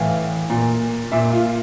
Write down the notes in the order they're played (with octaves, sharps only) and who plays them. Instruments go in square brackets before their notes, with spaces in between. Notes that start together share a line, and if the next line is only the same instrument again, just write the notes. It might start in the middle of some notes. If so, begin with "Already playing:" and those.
Already playing: [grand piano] A2 E3 F5
A#2
A#2 E5
F4